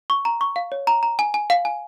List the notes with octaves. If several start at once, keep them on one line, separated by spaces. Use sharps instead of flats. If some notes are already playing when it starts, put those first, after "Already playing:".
C#6
A#5
C#6
F5
C#5
A#5
A#5
G#5
G#5
F5
G#5